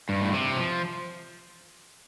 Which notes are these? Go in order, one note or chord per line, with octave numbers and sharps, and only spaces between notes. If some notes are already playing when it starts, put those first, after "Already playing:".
G2
A2
C3
F3